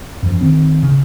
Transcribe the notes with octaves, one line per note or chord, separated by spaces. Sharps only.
F#2 F3
D#3 C4
C#3